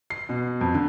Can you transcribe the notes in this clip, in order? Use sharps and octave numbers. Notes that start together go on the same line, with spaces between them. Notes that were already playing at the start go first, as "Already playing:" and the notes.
C7
B2
F2
D3